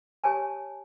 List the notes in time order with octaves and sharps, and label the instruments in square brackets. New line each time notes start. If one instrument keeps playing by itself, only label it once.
[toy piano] G4 C#5 G#5 A5